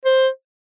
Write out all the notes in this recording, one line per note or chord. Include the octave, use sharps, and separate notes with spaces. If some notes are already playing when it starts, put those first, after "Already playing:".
C5